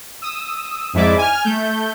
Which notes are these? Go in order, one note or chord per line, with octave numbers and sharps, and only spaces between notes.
D#6 E6
F2 G#2 G#3 E4 D5 D6
G#5 F6
A3 G6